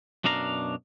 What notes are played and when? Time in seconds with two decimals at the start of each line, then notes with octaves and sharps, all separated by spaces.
0.24 F#2 B2 D4 F5 A#5